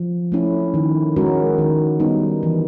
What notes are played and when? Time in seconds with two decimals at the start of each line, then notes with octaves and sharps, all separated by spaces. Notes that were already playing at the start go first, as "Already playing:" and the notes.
Already playing: F3
0.32 A3 C#4 E4
0.74 D#3
1.16 G#3 C#4 F#4 A#4
1.58 D#3
2.00 G3 B3 D#4
2.43 E3